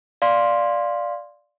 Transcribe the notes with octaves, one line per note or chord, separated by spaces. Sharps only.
D5 F5 C6